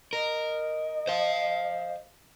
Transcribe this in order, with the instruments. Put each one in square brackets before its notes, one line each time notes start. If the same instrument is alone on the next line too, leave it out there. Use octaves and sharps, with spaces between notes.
[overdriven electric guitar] A#4 [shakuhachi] D#5
[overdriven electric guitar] C5 F5